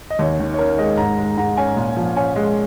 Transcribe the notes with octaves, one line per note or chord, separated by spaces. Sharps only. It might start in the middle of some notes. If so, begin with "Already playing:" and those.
D#5
D#2 C#5
D#3
C#5
C#4 A#4
G#3 D#5
G#2 A#5
G#3
G#2 A#5
C#4 G#5
A#2
F3
C#4 G#5
G#3